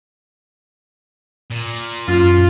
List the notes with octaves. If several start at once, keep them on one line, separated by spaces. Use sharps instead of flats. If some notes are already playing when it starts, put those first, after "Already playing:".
A#2
F#2 F4